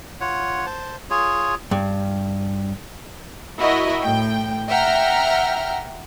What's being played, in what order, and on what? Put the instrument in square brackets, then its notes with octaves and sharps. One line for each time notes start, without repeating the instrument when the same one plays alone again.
[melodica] F4 C#5 F#5
C5 A5
F4 G#4 C#5
[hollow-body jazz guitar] G2
[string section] E4 F#4 A#4 D#5
A2 G5
E5 F#5 G5 A#5 F6